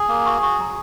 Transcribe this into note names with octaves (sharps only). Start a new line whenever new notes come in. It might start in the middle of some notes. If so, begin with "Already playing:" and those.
Already playing: G#4
A#3
F#4
F#4
F#3